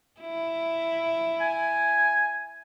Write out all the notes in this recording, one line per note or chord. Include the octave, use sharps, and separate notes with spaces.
E4
G#5